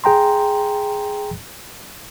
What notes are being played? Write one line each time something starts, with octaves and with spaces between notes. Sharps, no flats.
G#4 G5 A#5 C6